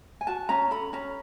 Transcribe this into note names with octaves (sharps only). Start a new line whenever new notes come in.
G#5
F#4 A5
C#4 A#5
A4 B5
C#4 A#5